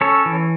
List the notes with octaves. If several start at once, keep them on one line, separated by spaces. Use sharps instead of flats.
C#4 A4 C#5
E3